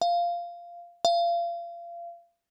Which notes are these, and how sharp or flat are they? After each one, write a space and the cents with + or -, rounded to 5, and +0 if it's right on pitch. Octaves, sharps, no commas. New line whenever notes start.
F5 -10
F5 -30